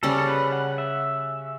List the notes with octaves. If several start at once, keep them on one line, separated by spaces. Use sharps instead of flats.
C#3 G3 C#4 A4
A4
B4
F#5
E5